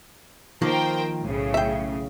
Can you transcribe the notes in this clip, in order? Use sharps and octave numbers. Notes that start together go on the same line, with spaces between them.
D#3 F3 A#3 A#4 C5 G5
B1 A2 C#3
E5 G5